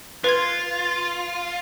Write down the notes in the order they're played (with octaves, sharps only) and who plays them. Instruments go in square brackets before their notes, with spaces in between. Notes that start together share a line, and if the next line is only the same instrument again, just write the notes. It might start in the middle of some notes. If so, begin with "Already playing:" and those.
[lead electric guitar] F4 [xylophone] B4 C6 G#6